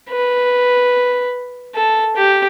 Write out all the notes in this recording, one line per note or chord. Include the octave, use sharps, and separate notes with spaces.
B4
A4
G4